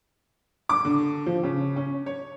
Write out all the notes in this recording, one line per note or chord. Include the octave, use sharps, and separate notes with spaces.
D6
D3
F3
C#3
C#4
C#5